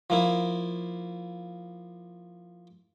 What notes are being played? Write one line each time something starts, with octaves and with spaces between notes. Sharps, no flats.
F3 A#3 E4